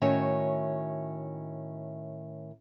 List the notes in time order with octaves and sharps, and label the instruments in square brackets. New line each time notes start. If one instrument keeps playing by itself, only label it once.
[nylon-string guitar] A2 D#3 C#4 F#4 C#5 E5